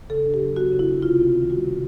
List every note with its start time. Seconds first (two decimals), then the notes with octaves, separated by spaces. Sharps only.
0.10 C#3 A4
0.26 D4
0.34 G4
0.42 F#3
0.56 B3 F#4
0.72 C#3
0.79 E4
0.88 D4
1.02 C3 F4
1.19 C4
1.34 D#3
1.50 G3 F#4
1.65 C3